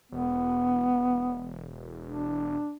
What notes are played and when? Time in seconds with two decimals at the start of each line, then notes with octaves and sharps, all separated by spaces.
0.12 E1 B3
2.06 D4